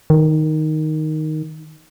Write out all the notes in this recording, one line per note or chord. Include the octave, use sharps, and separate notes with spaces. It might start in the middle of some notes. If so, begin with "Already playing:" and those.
D#3